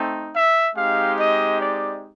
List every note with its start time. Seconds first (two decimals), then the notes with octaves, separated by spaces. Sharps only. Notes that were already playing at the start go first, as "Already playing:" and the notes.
Already playing: A3 C4 D#4
0.32 E5
0.75 G#3 C4 D#4 G4 F5
1.18 D#5
1.61 D5